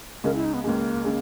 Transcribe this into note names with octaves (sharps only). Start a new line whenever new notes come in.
C#2 C#3 G#3 A#4
E4
D#4
B3
C#2 C#3 G#3 A#3
C#3 G#3